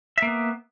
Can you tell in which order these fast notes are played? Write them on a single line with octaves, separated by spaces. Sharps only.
E5 A#3 B3